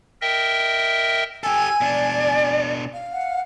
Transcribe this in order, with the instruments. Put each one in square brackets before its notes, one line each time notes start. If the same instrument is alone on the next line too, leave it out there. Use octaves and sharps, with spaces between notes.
[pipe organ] A#4 D#5 E5 G5
[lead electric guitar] G4 A4 [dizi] G#5 [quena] E6
[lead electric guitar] B2 D4 [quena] D5
[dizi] F5
[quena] F#5